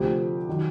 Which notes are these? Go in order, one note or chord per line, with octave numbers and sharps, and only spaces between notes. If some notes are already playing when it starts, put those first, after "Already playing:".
Already playing: D2 C3 F3 G4
D#3 F#3